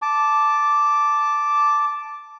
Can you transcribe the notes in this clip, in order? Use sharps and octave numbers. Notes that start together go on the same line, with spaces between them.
A5 D6